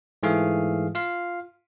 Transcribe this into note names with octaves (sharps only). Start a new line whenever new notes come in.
G#2 E3 A3 G#4 F5
F4 F5